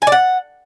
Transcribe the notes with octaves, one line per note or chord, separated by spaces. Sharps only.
G#5
D5
F#5